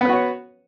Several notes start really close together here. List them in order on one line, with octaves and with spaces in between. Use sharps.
B3 B4 F#4 C#5